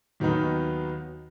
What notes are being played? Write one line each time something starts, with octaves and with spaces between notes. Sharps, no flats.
D#2 D#3 F#3 B3 D#4